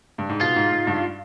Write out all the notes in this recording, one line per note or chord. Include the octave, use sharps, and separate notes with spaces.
G2
G#2
B2 F4
G#2
G#2
G2